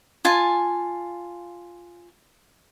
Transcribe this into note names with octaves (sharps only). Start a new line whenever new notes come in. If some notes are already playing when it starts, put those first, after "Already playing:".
F4 G#5 A5